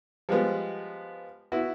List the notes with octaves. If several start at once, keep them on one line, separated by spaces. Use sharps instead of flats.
F3 G3 G#3 B3
B3 E4 F#4